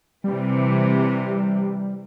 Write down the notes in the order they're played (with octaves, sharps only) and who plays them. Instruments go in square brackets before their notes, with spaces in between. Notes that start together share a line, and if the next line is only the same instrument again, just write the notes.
[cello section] C3 E3 [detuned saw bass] G3